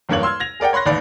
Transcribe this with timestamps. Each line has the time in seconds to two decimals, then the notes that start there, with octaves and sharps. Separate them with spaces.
0.09 B1 E2 G2 A#3 C#5 F#7
0.23 C6 E6 F6 G#6
0.40 G#6 A#6 F7
0.60 G#4 A#4 D5 F#5 G5
0.73 C#5 B5 C6 F#6 A#6
0.86 A1 D#2 D5 B5